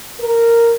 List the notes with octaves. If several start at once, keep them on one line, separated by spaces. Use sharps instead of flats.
A#4